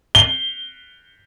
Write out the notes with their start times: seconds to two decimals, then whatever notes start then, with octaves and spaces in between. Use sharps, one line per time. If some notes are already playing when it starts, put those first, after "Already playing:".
0.15 G7